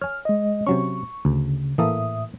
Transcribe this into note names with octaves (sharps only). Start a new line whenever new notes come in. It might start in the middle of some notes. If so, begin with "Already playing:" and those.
C#5 G#5 F6
G#3 D#5
C3 F#3 C#4 C#6
D2 C#3
A2 E3 A#3 A4 E5 D#6